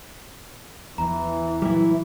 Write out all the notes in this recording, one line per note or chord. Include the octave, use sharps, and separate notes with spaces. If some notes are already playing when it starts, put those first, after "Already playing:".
E2 E3 A#5
A#2 F#3 G3 E4